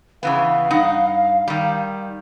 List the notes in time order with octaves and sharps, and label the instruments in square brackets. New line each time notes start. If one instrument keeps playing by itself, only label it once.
[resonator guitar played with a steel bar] C#3 E3 B3 [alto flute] F5
[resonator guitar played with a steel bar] G2 D#4 F#5
D#3 G3